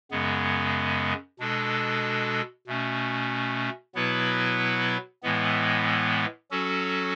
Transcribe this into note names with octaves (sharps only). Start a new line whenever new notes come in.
F#2 C#3 G#3 B3
B2 G#3 D4 A4
B2 A3 C#4
B2 F#3 B3 E4 B4
A2 E3 G#3 B3
F#3 C#4 F#4 A4